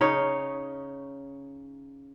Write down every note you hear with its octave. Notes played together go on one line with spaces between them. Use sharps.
C#3 D#4 C#5